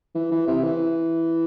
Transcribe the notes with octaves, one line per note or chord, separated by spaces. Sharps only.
E3
E3
C3
E3